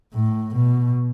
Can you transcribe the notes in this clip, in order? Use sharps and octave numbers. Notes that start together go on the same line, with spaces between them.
A2
B2